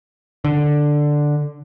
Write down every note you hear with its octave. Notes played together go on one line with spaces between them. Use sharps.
D3